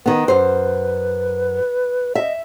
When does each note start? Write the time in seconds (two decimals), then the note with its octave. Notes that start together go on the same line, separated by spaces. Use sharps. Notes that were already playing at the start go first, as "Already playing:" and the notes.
0.06 D#3 B3 B4
0.28 F#2 C5
2.15 D#5 E5